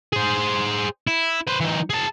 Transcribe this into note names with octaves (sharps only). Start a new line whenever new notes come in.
G#4 C5
E4
B4 C5
E3 D#4
G#4 A5